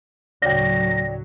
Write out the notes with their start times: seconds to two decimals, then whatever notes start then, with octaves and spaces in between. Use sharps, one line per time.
0.42 D2 A2 C#3 F#3 C#5 D5 G5 A#6